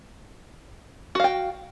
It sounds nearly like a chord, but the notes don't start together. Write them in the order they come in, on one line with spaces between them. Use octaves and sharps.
F#4 F5 G5